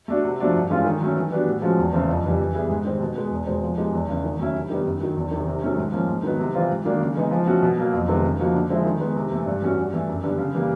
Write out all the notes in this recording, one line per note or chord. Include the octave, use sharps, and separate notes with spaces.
A3 D4 F#4
C3
F3 A3 D4 F#4
G2
E3 G#3 C#4 F4
D#3
F#3 A3 C#4
E3
G3 B3 D4 F#4
A2
F3 G#3 C#4 F#4
E2
C#3 E3 A3 C4
F2
C#3 E3 G3
E3
G3 B3 E4 G#4
G#2
D#3 G3 C4
B2
G#3 B3
E2
B2 G#3 C4
F3
G#3 B3 D#4 G4
E2
C#3 E3 A3
D#3
F#3 A3 C#4 E4
C3
D#3 G3 B3
F#2
D#3 F#3
E2
C3 D#3
C3
D#3 F#3 A3 C#4
G#2
F3 A#3 C#4
G#2
D#3 F#3 B3 D#4
C3
E3 G3 C4 F4
G#2
D#3 F#3 A#3 D4
C#3
E3 G#3 B3 D#4
F3
A3 C#4 F#4
B2
F#3 A#3
F2
C3 D#3 G#3 B3
C#3
F3 A#3 D#4 F#4
D3
F3 G#3 C4 E4
D#3
G#3 B3
C3
E3 A3
G2
E3 A3 C#4 F#4
G2
E3 A3
F#2
D3 G3 B3
C#3
E3 G3 A#3